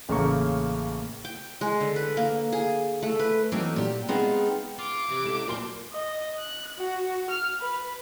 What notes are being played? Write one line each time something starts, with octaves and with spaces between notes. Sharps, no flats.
A1 C#3 A3 A#3 A#5 C#6
G5
G#3
D3
B4
A#3
G#4
A3
B4
E3 F#3 A3 A#3 C4 D#4
A#2 G4
G#3 B3 C4 D#4 F4 G#4
F4 D6
C3 E3
C#2 A3 E4 E7
A#2 F#3 C4 D4 C6 G7
D#5
F#6
F#4
F6
B4